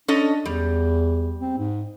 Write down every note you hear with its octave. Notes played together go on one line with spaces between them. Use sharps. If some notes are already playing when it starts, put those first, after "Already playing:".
C#4 D4 A4 D#5
E2 G3
C4
G#2